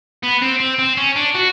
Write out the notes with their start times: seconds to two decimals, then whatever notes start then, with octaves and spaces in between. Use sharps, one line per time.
0.23 B3
0.42 C4
0.60 C4
0.79 C4
0.97 C#4
1.16 D4
1.35 F#4